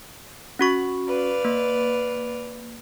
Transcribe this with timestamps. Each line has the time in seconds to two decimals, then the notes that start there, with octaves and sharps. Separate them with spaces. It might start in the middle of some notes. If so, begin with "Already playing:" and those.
0.59 C#4 F#4 C#6
1.08 B4 D5 F5
1.45 A#3